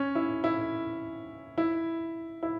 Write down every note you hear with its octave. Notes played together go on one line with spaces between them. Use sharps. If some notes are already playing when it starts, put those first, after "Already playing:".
Already playing: C#4
E4
E4
E4
E4